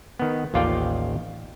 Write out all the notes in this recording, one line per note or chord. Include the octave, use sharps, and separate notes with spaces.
D#3 B3
A1 D#2 F4 D5 F5 G5